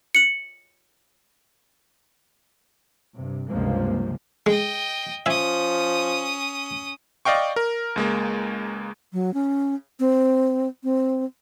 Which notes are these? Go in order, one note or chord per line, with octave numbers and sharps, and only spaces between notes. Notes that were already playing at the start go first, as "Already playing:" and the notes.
C#7 F#7
G2 C3
C#2 G2 C3 F3 G#3 A#3
G#3 D#5 G5
F3 C#4 E5 G#5 D#6
D5 D#5 F5 G5 C#6
A#4
C#2 G#3 A#3
F#3
C#4
C4
C4